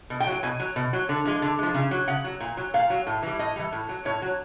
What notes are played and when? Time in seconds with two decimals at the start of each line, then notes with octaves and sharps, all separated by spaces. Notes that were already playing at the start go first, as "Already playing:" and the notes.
0.10 B2
0.20 G5
0.27 F#3
0.32 G5
0.43 B2 G#5
0.60 F#3
0.76 B2
0.93 F#3
1.09 D3
1.25 F3 G#3
1.42 D3
1.59 F3 G#3
1.74 C#3
1.91 F#3
2.08 C#3 F#5
2.24 F#3
2.40 A#2
2.57 F#3
2.74 A#2 F5
2.90 F#3
3.07 A2
3.23 E3 G3
3.39 A2 D#5
3.56 E3 G3
3.73 A2
3.89 F#3
4.05 A2 C#5
4.22 F#3